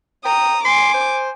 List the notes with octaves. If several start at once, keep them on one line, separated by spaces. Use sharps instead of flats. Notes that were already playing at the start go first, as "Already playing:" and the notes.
G5 A#5 D#6
G#5 C6 D6
C5